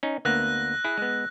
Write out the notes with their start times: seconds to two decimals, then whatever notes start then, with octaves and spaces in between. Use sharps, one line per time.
0.03 C#4 D#4
0.25 D2 A#3 B3 E6 F#6 A#6
0.84 E4 G#4
0.98 G#3 B3